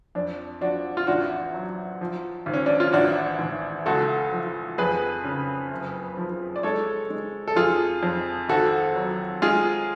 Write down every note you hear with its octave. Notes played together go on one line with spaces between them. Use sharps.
F2 D4
F3 D4 F#4
F4
A1 D4 F#4
F#3
F3
G#1
C#4
D4
F4
A1 D4 F#4
A1
C#2 F#4 A4
F3
F2 G#4 B4
C#3
F#1
F3
D5
G#3 A4 C#5
G#3
A4
F2 F4 G#4
F2
G#1 F#4 A4
F#3
G#3 F4 G#4